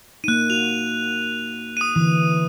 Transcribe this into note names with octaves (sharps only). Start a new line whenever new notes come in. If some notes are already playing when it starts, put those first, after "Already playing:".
A#3 D#4 F#6 D#7
F#4 F7
D#6 D#7
D3 E3